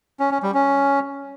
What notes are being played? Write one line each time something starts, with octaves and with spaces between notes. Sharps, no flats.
C#4
C#4
G3
C#4